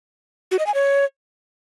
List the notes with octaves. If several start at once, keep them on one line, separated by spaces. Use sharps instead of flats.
F#4
D#5
G#5
C#5